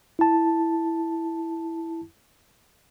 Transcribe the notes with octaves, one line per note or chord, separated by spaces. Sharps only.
E4 A5